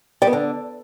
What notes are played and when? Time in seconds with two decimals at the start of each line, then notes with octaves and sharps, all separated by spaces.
0.22 G3
0.27 B3
0.33 D3